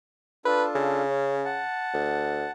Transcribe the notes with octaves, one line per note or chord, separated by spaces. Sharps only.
D4 F4 A4 B4
C#3
C#4
F#5 A5
D2